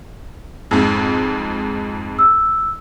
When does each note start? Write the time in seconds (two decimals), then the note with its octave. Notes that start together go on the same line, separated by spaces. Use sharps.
0.71 F2 G#2
2.19 E6